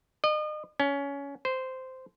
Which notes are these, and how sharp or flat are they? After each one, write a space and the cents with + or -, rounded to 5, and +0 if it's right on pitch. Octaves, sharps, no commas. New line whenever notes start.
D#5 -35
C#4 +20
C5 -10